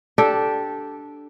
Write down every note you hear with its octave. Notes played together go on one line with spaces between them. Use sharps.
D4 G4 A4